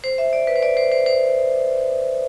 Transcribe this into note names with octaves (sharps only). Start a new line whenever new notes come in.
C5
E5
D5
B4
C5
D5
C5
C5
C5